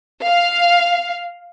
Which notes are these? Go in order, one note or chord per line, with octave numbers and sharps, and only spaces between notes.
F5